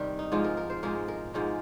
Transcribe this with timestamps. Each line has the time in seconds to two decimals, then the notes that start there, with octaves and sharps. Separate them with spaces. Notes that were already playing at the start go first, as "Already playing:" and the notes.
Already playing: C3 D#3 G3 A#4
0.19 D#4
0.32 G#2 F3 G#3 F4
0.44 A#4
0.57 A#4
0.70 C5
0.83 G#2 F3 G#3 A#4
1.08 A#4
1.34 G#2 F3 G#3